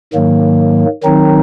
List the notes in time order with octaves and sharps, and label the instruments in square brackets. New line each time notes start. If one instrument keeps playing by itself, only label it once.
[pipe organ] G#2 D#3 F#3 A#3
D#3 F#3 C4 D#4